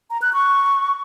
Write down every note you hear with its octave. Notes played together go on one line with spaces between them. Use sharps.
A#5
F#6
C#6